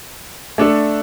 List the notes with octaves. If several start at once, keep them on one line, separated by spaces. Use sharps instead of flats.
A3 D4 A4